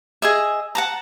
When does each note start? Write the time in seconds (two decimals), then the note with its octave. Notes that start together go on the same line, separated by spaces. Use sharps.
0.22 G#4 D#5 E5
0.75 F#5 A5 A#5